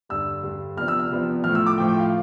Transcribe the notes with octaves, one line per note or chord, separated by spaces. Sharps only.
G2 D3 G3 E6
G2 D3 G3
C3 F3 B3 D4 F6
E6
F6
C3 F3 B3 D4
A2 F3 A3 F6
E6
D6
A2 F3 A3 G5
G5
F5